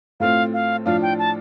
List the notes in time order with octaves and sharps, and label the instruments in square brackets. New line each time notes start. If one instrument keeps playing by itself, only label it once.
[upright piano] A2 A3 C4 F4 [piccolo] F5
[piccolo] F5
[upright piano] A2 F3 D4 F4 [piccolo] F5
[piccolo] G5
A5